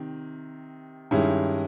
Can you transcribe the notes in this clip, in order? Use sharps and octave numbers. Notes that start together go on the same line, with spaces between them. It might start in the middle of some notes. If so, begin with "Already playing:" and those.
Already playing: C3 D#3
G2 D#3 G#3 C#4 E4